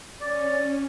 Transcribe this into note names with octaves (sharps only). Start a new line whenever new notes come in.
C#4 D5